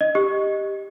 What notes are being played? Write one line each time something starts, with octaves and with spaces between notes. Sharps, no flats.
D#5
G4